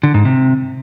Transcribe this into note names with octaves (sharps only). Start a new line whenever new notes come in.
D3
G#2
C3